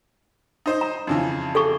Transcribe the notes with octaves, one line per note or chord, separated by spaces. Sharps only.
D#4 C5 D#5
A#5
F2 C#3 E3
G#4 A4 C#6